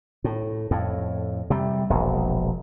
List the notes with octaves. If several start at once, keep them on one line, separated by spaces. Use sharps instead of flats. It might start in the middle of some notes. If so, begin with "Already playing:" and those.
A2
F2 A2
C3 G3
E1 A#1